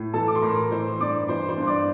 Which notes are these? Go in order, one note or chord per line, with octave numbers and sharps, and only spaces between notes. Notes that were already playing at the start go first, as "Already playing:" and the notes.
Already playing: A2
E3 A4 A5
D6
C6
A2 A#4 A#5
E3 C5 C6
G2 D5 D6
E3 C5 C6
C5 C6
G2
D5 D6